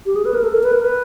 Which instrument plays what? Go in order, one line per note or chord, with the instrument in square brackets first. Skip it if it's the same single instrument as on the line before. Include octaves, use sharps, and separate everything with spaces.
[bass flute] G4
G#4
B4
A#4
A4
A#4
B4
A#4
B4